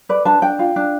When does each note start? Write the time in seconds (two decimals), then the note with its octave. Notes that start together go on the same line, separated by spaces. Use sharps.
0.09 B4 D5
0.25 D4 A5
0.42 D4 G5
0.59 F4
0.76 D4